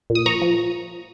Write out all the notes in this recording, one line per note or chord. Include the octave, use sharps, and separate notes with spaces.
A#2
D#6
F3 A#5 C#6
F3